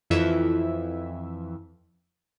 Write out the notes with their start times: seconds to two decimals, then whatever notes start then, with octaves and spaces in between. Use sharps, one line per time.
0.10 F2 E3 E5